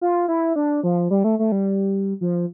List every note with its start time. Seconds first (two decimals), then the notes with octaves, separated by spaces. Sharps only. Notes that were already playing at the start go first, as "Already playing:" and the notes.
0.01 F4
0.28 E4
0.56 D4
0.83 F3
1.11 G3
1.24 A3
1.39 A3
1.52 G3
2.21 F3